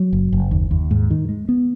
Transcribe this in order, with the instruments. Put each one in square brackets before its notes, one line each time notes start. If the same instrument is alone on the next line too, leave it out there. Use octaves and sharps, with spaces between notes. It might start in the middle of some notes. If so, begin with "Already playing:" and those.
Already playing: [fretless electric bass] F#3
F#1
F#1
D#2
D#2
G#2
D#3
G#3
B3